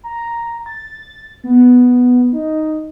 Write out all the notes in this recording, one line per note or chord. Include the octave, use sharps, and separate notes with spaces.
A#5
A6
B3
D#4